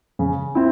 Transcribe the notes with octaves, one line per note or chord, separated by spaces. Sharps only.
C#3
C4 E4